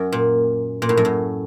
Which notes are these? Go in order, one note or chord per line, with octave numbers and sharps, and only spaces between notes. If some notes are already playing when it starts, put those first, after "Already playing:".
Already playing: F#2
A#2
A#2
A2
F#2
A2